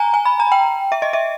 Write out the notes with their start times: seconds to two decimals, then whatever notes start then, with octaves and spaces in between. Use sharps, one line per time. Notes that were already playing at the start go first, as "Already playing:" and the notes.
Already playing: G#5 A#5
0.14 G#5
0.25 B5
0.40 A#5
0.52 G5
0.92 E5
1.02 D#5
1.13 E5